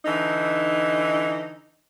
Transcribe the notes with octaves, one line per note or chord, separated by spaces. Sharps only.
D3 E3 D#4